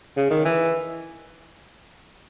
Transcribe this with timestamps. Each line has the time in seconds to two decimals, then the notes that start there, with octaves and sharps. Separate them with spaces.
0.17 C#3
0.30 D#3
0.45 E3